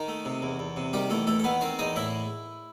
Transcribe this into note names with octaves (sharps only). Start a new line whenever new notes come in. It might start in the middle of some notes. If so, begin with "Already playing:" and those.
Already playing: D#3 D#4
A3
C3
E2
E2
C3
D#3 G3 G4
E2 A3 A4
E2 A3 A4
A4
D#3 B3 B4
D#3 C4 C5
E2 D#4 D#5
A2 E4 E5